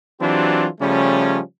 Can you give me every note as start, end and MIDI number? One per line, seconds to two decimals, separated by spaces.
0.21 0.68 52
0.21 0.68 54
0.21 0.68 60
0.21 0.68 62
0.21 0.68 65
0.21 0.68 67
0.81 1.40 49
0.81 1.40 53
0.81 1.40 55
0.81 1.40 57
0.81 1.40 61